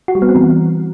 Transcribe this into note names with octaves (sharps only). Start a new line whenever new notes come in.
F#4
G3
B3
C4
E3